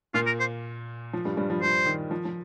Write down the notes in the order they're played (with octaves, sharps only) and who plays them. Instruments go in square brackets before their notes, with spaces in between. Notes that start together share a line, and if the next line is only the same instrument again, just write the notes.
[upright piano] A#2 A#3 [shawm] F4
[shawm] A#4
C5
[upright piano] F3
G2 G3
G2 G3
F3
[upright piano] F3 [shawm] C5
[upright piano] D#3
F3
F3